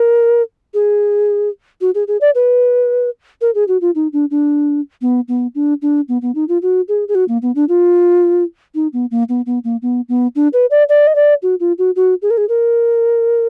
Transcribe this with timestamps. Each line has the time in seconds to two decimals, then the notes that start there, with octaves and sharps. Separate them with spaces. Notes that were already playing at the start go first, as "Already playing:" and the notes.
Already playing: A#4
0.74 G#4
1.81 F#4
1.95 G#4
2.07 G#4
2.21 D5
2.35 B4
3.41 A#4
3.55 G#4
3.68 F#4
3.81 F4
3.95 D#4
4.13 D4
4.30 D4
5.01 B3
5.28 B3
5.55 D4
5.82 D4
6.08 B3
6.22 B3
6.35 D#4
6.48 F4
6.62 F#4
6.88 G#4
7.08 G#4
7.15 F#4
7.28 A#3
7.42 B3
7.55 D4
7.69 F4
8.75 D#4
8.93 B3
9.11 A#3
9.29 B3
9.46 B3
9.64 A#3
9.82 B3
10.09 B3
10.35 D4
10.53 B4
10.71 D5
10.89 D5
11.07 D#5
11.15 D5
11.42 F#4
11.60 F4
11.78 F#4
11.96 F#4
12.22 G#4
12.30 A#4
12.37 G#4
12.49 A#4